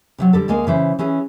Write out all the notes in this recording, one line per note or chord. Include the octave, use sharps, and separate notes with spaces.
C3 D#3 F#3
D3 G3 A4
D2 G#3 A#3 G#5
C#3 E3 C5
E3 C#4 G#4